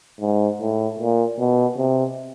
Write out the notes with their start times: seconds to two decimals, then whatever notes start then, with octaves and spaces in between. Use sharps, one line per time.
0.21 G#2
0.60 A2
0.99 A#2
1.39 B2
1.77 C3